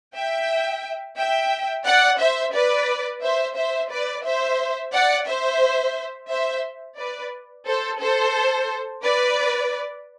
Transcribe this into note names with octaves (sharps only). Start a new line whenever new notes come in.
E5 G5
E5 G5
D5 F#5
C5 E5
B4 D5
C5 E5
C5 E5
B4 D5
C5 E5
D5 F#5
C5 E5
C5 E5
B4 D5
A4 C5
A4 C5
B4 D5